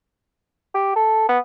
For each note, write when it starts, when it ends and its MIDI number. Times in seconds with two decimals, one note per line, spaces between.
0.74 0.91 67
0.96 1.27 69
1.29 1.38 59